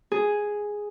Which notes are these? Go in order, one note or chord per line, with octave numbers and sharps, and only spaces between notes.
G#4